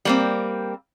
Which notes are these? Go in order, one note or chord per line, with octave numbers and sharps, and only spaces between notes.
G3 A#3 C4